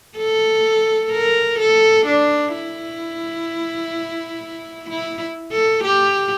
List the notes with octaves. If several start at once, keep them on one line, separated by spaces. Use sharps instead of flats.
A4
A#4
A4
D4
E4
E4
A4
G4